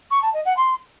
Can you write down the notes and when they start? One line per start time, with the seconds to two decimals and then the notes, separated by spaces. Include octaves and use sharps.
0.11 C#6
0.22 A5
0.34 D#5
0.45 F#5
0.57 C6